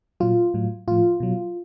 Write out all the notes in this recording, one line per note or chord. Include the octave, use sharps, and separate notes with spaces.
A#2 F#3 F4
A2 F#3
A2 F3 F4
B2 F#3